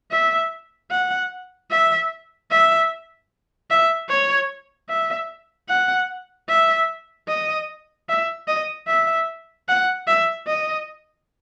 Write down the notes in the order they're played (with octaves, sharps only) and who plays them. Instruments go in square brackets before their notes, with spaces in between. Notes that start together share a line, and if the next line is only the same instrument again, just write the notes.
[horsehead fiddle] E5
F#5
E5
E5
E5
C#5
E5
F#5
E5
D#5
E5
D#5
E5
F#5
E5
D#5